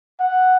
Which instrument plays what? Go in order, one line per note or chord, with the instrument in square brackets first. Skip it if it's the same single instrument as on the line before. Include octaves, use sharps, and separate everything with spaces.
[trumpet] F#5